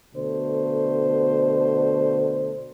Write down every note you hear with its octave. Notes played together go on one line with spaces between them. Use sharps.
B2 D3 A3 C5